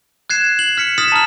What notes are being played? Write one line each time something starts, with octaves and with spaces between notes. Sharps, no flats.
F#6 G#6 C7 E7
F#7
F6 B6 C#7
D#6 F6 A6 B6 E7
A5 A#5 F6